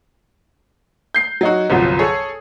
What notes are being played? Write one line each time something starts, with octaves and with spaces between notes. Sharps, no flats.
G6 C7
F#3 D#4 F#4
G1 C2 F3 F#3
G#4 A4 C#5